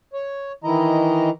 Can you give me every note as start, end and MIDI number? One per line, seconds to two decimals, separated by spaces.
0.13 0.52 73
0.64 1.30 51
0.64 1.30 52
0.64 1.30 64
0.64 1.30 75
0.64 1.30 82